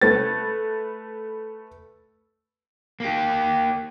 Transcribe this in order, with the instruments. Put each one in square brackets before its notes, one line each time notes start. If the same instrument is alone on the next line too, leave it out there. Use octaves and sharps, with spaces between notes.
[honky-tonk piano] A3 B4 A6
[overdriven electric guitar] A#3 G4